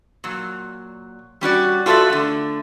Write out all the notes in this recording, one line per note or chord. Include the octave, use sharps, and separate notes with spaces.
A#2 F#3
G3 C#4 F#4 D5
F4 F#4 A4 B4 D5 E5
D3 A3